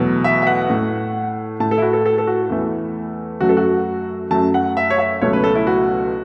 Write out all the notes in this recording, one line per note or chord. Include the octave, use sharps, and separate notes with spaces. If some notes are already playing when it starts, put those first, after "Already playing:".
Already playing: E2 B2 F#3 A3
E5
E5
F#5
A2 A3
A2 A3 A5
A4
E4
F#4
A4
A4
A4
F#4
E2 E3 A3
F#2 F#3 A3 F#4
A4
F#4
F#2 F#3 A3 A5
F#5
E5
C#5
E5
C#2 B2 F#3 A3 C#5
B4
A4
E4
F#4